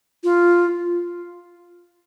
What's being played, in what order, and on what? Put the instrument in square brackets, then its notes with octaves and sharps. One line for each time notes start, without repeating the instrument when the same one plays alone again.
[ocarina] F4